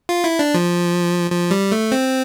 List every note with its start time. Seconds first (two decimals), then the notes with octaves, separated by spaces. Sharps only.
0.09 F4
0.24 E4
0.39 D4
0.54 F3
1.31 F3
1.51 G3
1.72 A3
1.92 C4